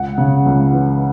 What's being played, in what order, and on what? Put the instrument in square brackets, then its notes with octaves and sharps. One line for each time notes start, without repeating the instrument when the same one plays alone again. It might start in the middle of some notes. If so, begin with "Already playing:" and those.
Already playing: [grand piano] C#2 F#5
C#3
C#2
E3